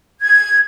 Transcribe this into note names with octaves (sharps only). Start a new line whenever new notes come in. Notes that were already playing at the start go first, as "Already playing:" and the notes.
G#6